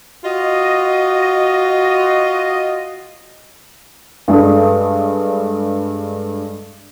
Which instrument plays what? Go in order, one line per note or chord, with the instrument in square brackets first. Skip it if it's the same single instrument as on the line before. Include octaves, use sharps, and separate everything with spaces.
[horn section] F4 F#4 D#5
[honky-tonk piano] G2 G#3 D4 A4 D#6